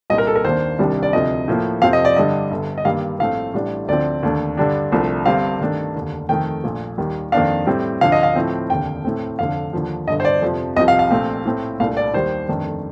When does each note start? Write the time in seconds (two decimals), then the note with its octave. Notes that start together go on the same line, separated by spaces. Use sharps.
0.10 C2 A#2 G3 C4 D#5
0.18 A#4
0.27 A4
0.36 A#4
0.45 D#2 D#3 A#3 D4 C5
0.79 C2 C3 D#3 G3 D4
1.03 D5
1.13 D2 C3 F3 D#5
1.48 A2 F3 A#3
1.81 F2 C3 F3 C4 F5
1.93 D#5
2.05 D5
2.16 G2 D3 G3 D4 D#5
2.51 G1 G2 D3
2.78 D#5
2.85 G2 D#3 G3 A#3 F5
3.19 A#1 A2 A3 C4 F5
3.54 A1 A2 G3 D4
3.88 D2 D3 F3 C4 D5
4.23 D#2 D3 A3 D4
4.57 G2 D3 G3 D4
4.92 C2 C3 F3 A3 D4
5.26 G1 G2 D3 G3 C4 F5
5.60 G2 D#3 A3 D4
5.95 F1 D#2 D3
6.29 F2 D#3 A3 G5
6.64 A#1 A#2 A3
6.98 D#2 D#3 G3
7.32 F2 D#3 A#3 D4 F5
7.67 A2 G3 C4
8.01 D2 D3 F3 F5
8.12 D#5
8.23 F5
8.35 A2 F3 C4
8.70 F1 D#2 D3 G5
9.05 A2 A3 C4
9.39 F1 F2 D3 F5
9.73 D#2 D3 F3
10.08 G1 G2 D3 D#5
10.20 C5
10.25 D5
10.42 F2 C3 F3
10.76 C2 C3 F3 D#5
10.88 F5
10.99 F5
11.10 A#1 A#2 A3 C4
11.45 A2 A3 C4
11.80 C2 A#2 A3 D4 F5
11.97 D5
12.13 D#2 D#3 G3 C5
12.48 G1 F2 D#3 A3 D4